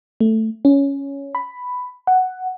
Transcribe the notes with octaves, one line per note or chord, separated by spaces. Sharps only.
A3
C#4
B5
F#5